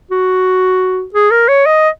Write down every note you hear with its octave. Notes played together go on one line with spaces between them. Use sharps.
F#4
G#4
A#4
C#5
D#5